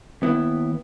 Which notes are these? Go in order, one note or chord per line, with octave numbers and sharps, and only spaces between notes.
D#2 B3 E4